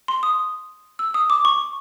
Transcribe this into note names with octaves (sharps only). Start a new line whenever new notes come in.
C6
D#6
E6
D#6
D6
C#6